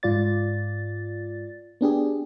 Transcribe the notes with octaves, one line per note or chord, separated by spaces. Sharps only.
G#2 F4 D5 A6
B3 D4 G4 G#4